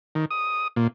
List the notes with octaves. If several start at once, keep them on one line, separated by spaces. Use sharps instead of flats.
D#3
D#6
A#2